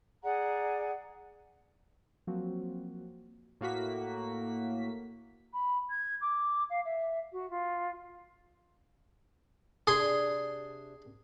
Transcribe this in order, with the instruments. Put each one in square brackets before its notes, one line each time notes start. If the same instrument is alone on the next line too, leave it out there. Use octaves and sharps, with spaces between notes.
[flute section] G#4 D5 F#5 A#5
[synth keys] F3 F#3 A#3 C4 F#4
[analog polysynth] A2 A#3 F#4 B6
[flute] B5
G#6
D6
F5
E5
F#4
F4
[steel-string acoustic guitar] C3 D4 G4 [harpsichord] G#4 C6